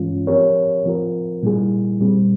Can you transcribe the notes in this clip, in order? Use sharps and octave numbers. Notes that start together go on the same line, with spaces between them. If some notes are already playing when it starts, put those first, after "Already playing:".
Already playing: G2 E3 G#3 C#4 F4
F3 C4 G4 A#4 C#5
F3 C4 F4 A#4
A#2 G3 A#3 E4 G#4
A#2 G3 C4